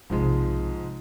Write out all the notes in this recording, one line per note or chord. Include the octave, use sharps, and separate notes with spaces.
B1 G#2 C3 F3 G#3